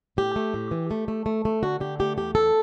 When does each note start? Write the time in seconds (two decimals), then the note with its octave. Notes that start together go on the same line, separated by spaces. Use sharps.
0.17 A2 G4
0.36 A3
0.54 A2
0.71 E3
0.91 A3
1.08 A3
1.26 A3
1.45 A3
1.63 D3 F#4
1.80 D3 G4
2.00 A3 G4
2.17 E2 G4
2.35 E2 A4